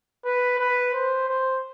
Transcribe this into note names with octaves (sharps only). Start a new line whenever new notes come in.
B4
B4
C5
C5